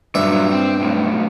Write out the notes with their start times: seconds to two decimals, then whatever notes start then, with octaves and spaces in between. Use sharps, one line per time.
0.15 G2 A#2 F#3 E5
0.52 C4
0.80 B1 A2